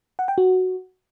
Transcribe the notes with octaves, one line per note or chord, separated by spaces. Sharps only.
F#5
G5
F#4